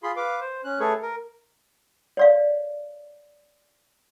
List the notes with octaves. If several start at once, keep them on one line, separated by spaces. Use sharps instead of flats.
F4 G#4 B5 C6
B4 F5 D6
C5
C#4 F#6
A3 G#4 A4 B4 C#5 C#6
A#4
C#5 D5 F5